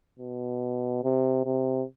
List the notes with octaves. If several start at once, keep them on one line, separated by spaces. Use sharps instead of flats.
B2
C3
C3